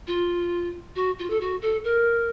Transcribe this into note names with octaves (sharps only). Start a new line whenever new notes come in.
F4
F#4
F4
A4
F#4
A4
A#4